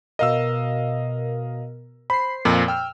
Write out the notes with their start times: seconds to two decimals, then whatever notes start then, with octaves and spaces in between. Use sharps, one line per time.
0.19 B2 A#4 D#5 F5 E6
2.10 C5 B5 C7
2.45 F2 A#2
2.68 G5 E6 F6